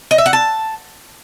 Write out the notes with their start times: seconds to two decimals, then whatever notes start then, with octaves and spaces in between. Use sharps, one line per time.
0.11 D#5
0.18 E5
0.26 F#5
0.33 A5